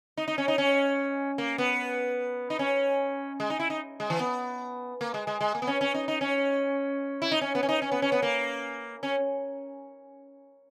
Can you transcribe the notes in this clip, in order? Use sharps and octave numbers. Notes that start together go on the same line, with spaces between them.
D#4
D#4
C#4
D#4
C#4
A#3
B3
D#4
C#4
G#3
D#4
E4
D#4
G#3
E3
B3
A#3
G#3
G#3
G#3
A#3
B3
C#4
C#4
D#4
D#4
C#4
E4
D#4
C#4
B3
C#4
D#4
C#4
B3
C#4
B3
A#3
C#4